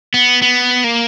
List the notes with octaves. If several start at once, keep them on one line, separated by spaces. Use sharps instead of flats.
B3
B3
A#3